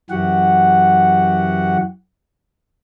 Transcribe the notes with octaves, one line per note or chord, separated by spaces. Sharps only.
F#2 E3 F#4 G4 F#5